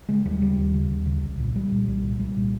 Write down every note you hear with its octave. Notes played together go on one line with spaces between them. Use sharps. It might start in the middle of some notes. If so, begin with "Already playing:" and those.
C#3 G#3
D#2 G3
C#3 G3
D#2
C#3
D#2
C#3
C2
A#2
C2 G3
A#2
C2 G3
A#2
C2 G3
A#2